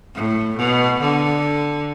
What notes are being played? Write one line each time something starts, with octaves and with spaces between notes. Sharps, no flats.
A2
B2
D3